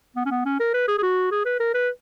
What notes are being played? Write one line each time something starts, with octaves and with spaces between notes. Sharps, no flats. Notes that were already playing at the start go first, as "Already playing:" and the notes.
B3
C#4
B3
C#4
A#4
B4
G#4
G#4
F#4
G#4
B4
A#4
B4